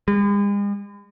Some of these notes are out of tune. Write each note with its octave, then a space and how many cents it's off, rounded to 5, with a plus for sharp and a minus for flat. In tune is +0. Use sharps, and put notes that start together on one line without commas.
G#3 -45